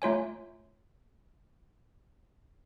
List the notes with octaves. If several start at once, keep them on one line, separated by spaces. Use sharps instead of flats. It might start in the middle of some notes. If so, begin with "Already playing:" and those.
A3 F4 C#5 G#5